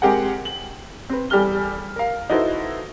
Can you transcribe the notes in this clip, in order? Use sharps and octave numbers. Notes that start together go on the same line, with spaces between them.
G#3 C4 G4 G#4 A#4 F#5
F#7
C4 B4
E2 G3 G4 A4 F6 G7
A#4 F5
D#4 E4 F#4 A4 B4 C5